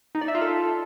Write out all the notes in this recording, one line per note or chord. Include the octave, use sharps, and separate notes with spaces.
D#4
D5
E5
F4
A4